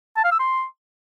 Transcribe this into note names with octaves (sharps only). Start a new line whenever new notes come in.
A5
F5
E6
C6